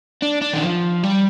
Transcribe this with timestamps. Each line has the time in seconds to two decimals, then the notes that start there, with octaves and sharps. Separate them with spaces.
0.23 D4
0.42 D4
0.54 D#3
0.63 F3
1.03 G3